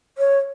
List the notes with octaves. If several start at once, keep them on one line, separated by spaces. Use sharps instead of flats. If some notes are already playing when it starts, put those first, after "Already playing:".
C#5